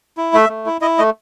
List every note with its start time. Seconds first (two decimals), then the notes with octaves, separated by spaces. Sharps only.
0.17 E4
0.33 A3 E5
0.49 A3
0.66 E4
0.81 E4 D#5
0.98 A3 D#5